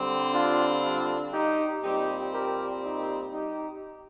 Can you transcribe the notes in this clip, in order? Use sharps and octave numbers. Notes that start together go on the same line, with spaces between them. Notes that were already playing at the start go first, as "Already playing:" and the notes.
Already playing: D3 G3 C4
D4 F4
D4 F4
D#4 G4
A#2 G3 C4 D#4 G4
G4 A#4
D#4 G4
D#4 G4